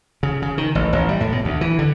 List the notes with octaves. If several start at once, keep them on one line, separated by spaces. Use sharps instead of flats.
C#3
C#3
D#3
A1
A1
G3
A2
B2
D2
E3
D3